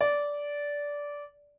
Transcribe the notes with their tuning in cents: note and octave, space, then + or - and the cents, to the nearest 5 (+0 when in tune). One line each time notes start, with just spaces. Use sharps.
D5 -15